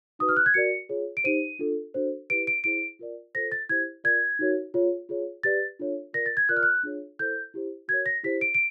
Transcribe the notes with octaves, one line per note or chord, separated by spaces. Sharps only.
D#4 F#4 B4 D#6
F6
F#6
G#6
F#4 A#4 D5 C#7
F4 G#4 C#5
D7
D#4 G4 C5 D#7
D4 F4 A4
D4 F#4 A4 C5
E4 G4 B4 D7
D7
E4 G#4 C5 D7
F4 A#4 D5
F4 A4 C5 A#6
A6
E4 G4 C5 G#6
F4 A#4 D5 G#6
D#4 F#4 A#4 C#5
F4 G#4 C#5
F4 G#4 C#5
G4 B4 D5 A6
D4 F4 A4 C#5
F4 A#4 D5 A#6
A6
G#6
F4 A#4 D5 F#6
F6
F#6
D4 F4 G#4 C#5
E4 A4 C5 G6
E4 G4 C5
F#4 A#4 C#5 G#6
A#6
E4 G4 C5 B6
D7
D7